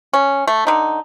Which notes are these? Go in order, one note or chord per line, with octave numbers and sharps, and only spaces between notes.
C#4
A3
D3 D#4